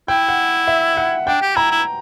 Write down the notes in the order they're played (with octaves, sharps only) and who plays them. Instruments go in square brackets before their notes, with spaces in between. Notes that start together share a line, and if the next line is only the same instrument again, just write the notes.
[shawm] E4 [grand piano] G5
[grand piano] F#5
E5
F#5
[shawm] D4 [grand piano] G5
[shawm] G4
[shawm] E4 [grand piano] A#5
[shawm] E4